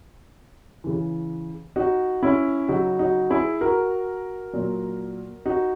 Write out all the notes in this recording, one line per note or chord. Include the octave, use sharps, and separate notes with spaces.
C#3 E3
D#4 F#4
C#4 E4
C#3 F#3 D#4 F#4
D#4 F#4
E4 G#4
F#4 A#4
A#2 F#3
D#4 F#4